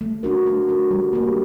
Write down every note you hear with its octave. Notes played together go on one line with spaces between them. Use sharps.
A3
D4 F#4 A#4
A3
D4 F#4 A#4
G3
A#3 D4 G4 A#4